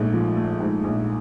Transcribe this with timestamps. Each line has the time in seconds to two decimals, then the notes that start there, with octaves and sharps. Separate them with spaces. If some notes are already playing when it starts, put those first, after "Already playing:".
Already playing: A#1 G#2 A3
0.14 F3
0.37 A3
0.60 G#2
0.84 A#1